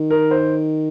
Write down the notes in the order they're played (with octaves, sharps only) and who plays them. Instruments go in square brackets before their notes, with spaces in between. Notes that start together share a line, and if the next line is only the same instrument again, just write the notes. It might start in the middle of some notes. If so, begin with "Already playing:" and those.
Already playing: [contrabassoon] D#3
[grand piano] A#4
C5